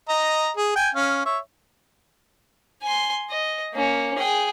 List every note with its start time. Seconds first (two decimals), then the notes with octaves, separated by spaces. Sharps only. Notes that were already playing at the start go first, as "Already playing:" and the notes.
0.09 D#5 A#5
0.57 G#4
0.76 G5 G#5
0.95 C#4 F5
1.26 C#5 E5
2.83 G#5 C6
3.31 D#5
3.74 A#3 C#4
4.18 G#4 G5